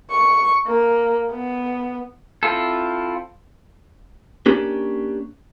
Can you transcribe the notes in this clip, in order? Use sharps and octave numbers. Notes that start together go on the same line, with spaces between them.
C#6
A#3
B3
C4 E4 F4 A4
A#3 C#4 D4 G4